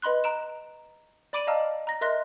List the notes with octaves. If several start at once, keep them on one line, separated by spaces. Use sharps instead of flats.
B4 D#5 B5 C6 F#6
A#5 D7 E7
D5 B5 D6 D7 D#7 F#7
D#5 F5 A5 A#5 E6 F6
A#5 A#6
A#4 D#5 E5 C6 F#6 A#6